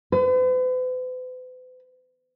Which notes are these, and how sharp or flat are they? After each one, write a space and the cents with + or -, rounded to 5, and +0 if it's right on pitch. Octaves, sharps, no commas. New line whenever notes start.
B4 +45